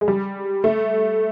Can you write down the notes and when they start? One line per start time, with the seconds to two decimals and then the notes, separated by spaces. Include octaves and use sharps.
0.01 G#3
0.08 G3
0.64 A3